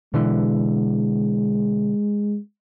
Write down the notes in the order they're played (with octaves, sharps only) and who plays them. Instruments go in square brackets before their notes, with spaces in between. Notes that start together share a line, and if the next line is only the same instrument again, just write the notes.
[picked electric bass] B2 D3 E3 [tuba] G#3